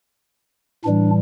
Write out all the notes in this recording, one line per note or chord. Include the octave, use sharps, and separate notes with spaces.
A2 E3 G3 D4